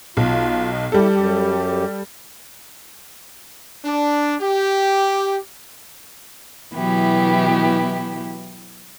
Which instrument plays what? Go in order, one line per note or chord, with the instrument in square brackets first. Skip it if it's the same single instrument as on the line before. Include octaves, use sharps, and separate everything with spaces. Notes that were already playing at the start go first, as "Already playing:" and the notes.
[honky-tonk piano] B1 [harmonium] F4
[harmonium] D#5
[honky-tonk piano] G3 A4 [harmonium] E4 G4
[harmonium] F#2 G4
[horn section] D4
G4
[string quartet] B2 E3 F#3 B3 E4 G4